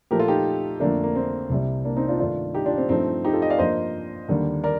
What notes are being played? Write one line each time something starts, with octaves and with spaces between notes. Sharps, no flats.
A#2 F3 A3 G4 A#4
F4 A4
D#4 G4
F2 D3 A3 A#3 D4
A#3
C4
C2 C3 G3
A#3 D4
C4 D#4
D4 F4
G2 D#3 A3 D4 F4
D#4 G4
D4 F4
C4
G2 F3 A3 C4 D#4
D#4 G4
F4 A4
D#5 G5
D5 F5
G2 F3 A#3 C5 D#5
D#2 D3 G3 A#3
A#4 D5